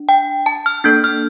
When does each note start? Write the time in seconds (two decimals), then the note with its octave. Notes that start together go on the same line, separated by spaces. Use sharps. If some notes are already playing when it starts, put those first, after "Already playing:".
Already playing: D4
0.09 G5
0.46 A5
0.66 F6
0.84 A#3 D4 A4 G6
1.04 F6